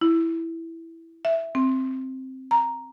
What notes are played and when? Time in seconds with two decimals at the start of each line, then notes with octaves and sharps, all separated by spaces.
0.01 E4
1.25 E5
1.55 C4
2.51 A#5